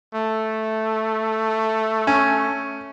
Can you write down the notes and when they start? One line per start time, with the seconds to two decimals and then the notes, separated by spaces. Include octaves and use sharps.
0.15 A3
2.07 C#4